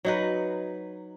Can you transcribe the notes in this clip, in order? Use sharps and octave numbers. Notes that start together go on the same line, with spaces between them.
F#3 D#4 B4